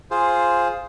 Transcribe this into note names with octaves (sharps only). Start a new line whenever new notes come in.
F4 G#4 C5